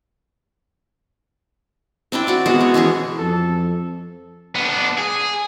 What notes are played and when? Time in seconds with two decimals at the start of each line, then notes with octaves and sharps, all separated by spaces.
2.12 C4 D4 E4 G5
2.27 C4 F#4 D5
2.46 B2 G#3 C5 F#5
2.61 C#5
2.74 E3 C#4 E4 G#4
3.18 F2 A4
4.56 B3 D4
4.98 G#4